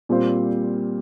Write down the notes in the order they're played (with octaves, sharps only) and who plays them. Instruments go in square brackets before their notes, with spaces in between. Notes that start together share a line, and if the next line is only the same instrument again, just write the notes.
[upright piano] A#2 G3 C4 F4 C5